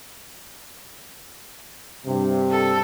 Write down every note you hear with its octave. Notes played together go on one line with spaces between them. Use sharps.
G2 C3
A4